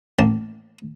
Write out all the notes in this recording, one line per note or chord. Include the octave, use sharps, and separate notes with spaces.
A1 A#3 A5